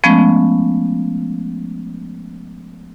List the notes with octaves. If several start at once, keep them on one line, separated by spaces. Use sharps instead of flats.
F3 G#3 A3 B3 C#4